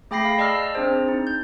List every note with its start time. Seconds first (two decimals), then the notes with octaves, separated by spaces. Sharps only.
0.11 A3 G#4 G5 B5 A#6 C7
0.25 F5
0.38 D5 D#5 A5 E6 F6
0.75 C4 D4 G#4 C5
1.08 D#4
1.27 G6